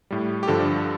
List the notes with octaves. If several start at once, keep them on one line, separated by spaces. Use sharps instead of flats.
A2 G3
G4
G2 D3 F3 A4